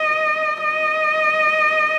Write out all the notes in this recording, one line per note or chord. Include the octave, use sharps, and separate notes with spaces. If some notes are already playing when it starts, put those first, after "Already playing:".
Already playing: D#5
D#5